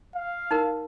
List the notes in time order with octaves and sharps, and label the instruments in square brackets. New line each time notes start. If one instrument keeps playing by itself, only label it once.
[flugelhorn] F5
[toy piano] D#4 A#4